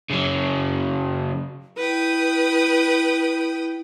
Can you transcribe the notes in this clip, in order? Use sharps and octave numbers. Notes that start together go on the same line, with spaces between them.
C#3 F#3
E4 B4 G5 D#6